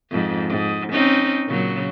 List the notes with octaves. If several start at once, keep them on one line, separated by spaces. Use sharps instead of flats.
F2 G#2
G#2
C4 C#4 D#4
A#2 C#3 F#3